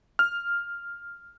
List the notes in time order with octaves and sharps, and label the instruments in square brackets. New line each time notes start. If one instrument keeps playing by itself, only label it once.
[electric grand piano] F6